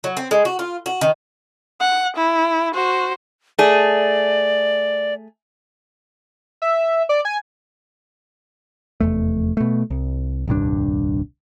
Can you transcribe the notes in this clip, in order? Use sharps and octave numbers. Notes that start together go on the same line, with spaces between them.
F#3
C4
G#3
F#4
F4
F#4
D#3
F#5
E4
F#4 C5
A3 G#4 D5
E5
D5
G#5
F1 E2 A3
B2 A3
C2
D#1 C2 G2 D4